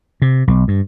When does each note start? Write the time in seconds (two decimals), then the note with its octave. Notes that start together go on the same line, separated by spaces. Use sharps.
0.22 C3
0.47 B1
0.68 G2